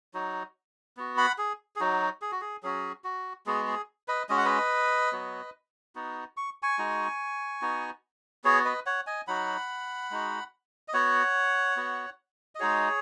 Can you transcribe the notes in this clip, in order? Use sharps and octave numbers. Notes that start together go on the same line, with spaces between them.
F#3 D#4 F#4
B3 F#4
F#5 B5
G#4
G#4
F#3 D#4 F#4
G#4
F#4
G#4
F#3 C#4 F#4 G#4
F#4
G#3 B3 F#4 G#4
G#4
B4 D#5
G#3 C#4 F#4 D#5
F#5
B4 D#5
F#3 B3 F#4
B3 D#4 F#4
C#6
G#5 C#6
G#3 D#4 F#4
B3 D#4 F#4
B3 F#4 G#4 C#5
B4 D#5
C#5 F#5
D#5 G#5
F#3 D#4 F#4 F#5 B5
G#3 D#4 F#4
D#5
B3 F#4 C#5 F#5
B3 F#4
D#5
G#3 D#4 F#4 G#4 C#5